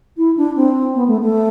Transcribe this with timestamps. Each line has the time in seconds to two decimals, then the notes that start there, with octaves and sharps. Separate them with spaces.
0.17 E4
0.36 D4
0.56 C4
0.94 B3
1.07 A3
1.21 A3